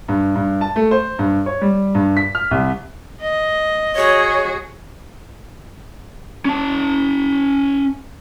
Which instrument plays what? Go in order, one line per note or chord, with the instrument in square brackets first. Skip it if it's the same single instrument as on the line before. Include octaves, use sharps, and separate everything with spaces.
[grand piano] G2
G2
A5
A3
C5
G2
C#5
G3
G2
B6
F6
C2
[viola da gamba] D#5
[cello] F#4 G#4 [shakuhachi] C#5
[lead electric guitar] C#4 A5